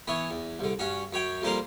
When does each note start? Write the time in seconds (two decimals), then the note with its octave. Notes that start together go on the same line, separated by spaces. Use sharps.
0.08 E3 B3 E4 C#5
0.31 E2
0.59 C2 D3
0.79 G2 C#4 F#4
1.13 F#2 C#5 G5
1.42 F2 F3 G3 A#3 C5 A#5